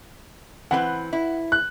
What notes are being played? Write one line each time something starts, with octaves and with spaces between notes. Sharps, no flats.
E3 C4 B4 F#5
E4
F#6